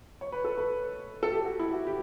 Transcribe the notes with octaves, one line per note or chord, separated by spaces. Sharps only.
C#5
B4
A4
B4
A4
G4
F#4
E4
F#4
G4